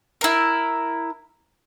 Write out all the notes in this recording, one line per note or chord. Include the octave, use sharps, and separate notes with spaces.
E4 A#4